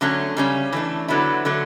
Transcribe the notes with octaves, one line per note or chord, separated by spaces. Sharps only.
D3 F#3 A3 C#4
C#3 G3 C#4
E3 A3 D4
D3 F#3 B3 E4
D3 F#3 A3